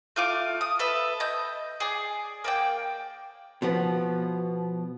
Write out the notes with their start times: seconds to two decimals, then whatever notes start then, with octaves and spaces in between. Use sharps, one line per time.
0.16 A3 F4 F5 D6
0.61 D#6
0.79 A4 B4 E5
1.20 D#5 G6
1.80 G#4 D5
2.44 A#3 D5 G5
3.62 B2 F3 B3